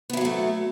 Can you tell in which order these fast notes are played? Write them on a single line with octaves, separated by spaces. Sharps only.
B3 E4 F#3 F#4 A3